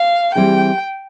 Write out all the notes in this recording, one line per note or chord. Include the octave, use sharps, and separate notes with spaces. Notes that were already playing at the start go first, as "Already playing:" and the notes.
Already playing: F5
E3 G3 C4 E4 G#4 G5